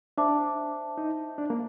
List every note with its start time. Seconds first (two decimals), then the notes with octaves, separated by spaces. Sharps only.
0.17 D4 C5 E5 A5 D6
0.98 D#4
1.38 D4
1.50 A#3